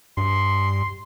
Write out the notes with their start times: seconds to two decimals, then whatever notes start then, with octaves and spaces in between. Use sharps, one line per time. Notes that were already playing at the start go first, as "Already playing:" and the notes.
0.17 G2 C6